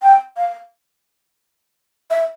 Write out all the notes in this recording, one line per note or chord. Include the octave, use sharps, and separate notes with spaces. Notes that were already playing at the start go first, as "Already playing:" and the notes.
G5
F5
E5